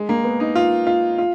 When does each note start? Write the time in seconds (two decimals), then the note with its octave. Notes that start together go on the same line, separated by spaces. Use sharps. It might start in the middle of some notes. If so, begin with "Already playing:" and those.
Already playing: G#3
0.09 A#3
0.24 B3
0.40 D#4
0.56 F4
0.87 F4
1.18 F4